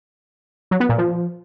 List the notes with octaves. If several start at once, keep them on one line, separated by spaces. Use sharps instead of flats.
F#3
B3
A#2
F3